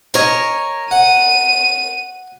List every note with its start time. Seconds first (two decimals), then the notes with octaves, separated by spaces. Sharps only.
0.14 A#4 C#5 D#5 G#5
0.91 F#5 D#7